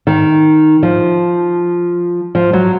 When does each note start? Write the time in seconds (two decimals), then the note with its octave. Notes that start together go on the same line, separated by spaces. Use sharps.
0.07 D#3
0.83 F3
2.35 F3
2.53 F#3